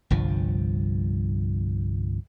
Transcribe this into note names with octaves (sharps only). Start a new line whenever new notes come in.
G1 C2 G2 F3